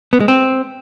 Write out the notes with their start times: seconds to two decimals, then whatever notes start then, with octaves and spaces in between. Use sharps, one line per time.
0.13 B3
0.20 G#3
0.28 C4